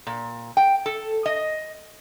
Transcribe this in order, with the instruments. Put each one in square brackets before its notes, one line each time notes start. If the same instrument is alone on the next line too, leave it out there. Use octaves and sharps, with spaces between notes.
[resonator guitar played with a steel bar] A#2
G5
A4
D#5